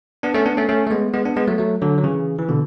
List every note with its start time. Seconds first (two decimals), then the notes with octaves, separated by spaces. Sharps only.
0.23 B3 D4
0.34 A3 C#4
0.46 B3 D4
0.57 A3 C#4
0.69 A3 C#4
0.87 A3
0.91 G#3 B3
1.14 G#3 B3
1.25 B3 D4
1.36 G#3 B3
1.47 F#3 A3
1.58 F#3 A3
1.82 D3 F#3
1.98 F#3
2.04 C#3 E3
2.38 E3
2.48 B2 D3